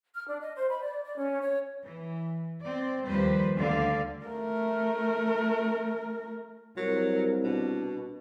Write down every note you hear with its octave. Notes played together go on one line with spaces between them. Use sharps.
F6
D4
D#5
C5
B5
D5
D5
C#4
C#5
E3
C4 D5
D#2 F3 G3 B4 C5
D2 D3 D5 F5
A3 A#4
C2 F#3 A#4
B2 D4